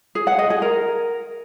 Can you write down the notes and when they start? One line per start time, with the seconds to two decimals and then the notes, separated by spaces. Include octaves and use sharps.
0.15 G#4
0.27 F#5
0.39 D#5
0.50 G#4
0.62 A#4